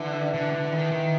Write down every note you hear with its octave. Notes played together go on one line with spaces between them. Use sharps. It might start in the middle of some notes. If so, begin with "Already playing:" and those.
Already playing: D3 E3
D3
D3
D#3
D#3